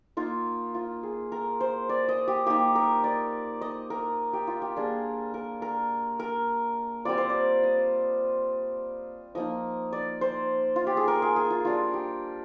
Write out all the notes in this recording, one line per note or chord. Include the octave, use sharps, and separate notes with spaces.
A#3 D#4 F4
F4
G#4
A#4
C5
D5
D#5
G4
A#3 D#4 G4
A#4
D5
D#5
A#4
G4
F4
G4
G3 A#3 D4 F4 G#4
A#4
A#4
A#4
G3 C4 F4 D5
C5
D5
D#5
F3 A#3 D#4 D#5
D5
C5
F4
G4
G#4
A#4
G#4
G#4
F4
G3 D4 F4
G4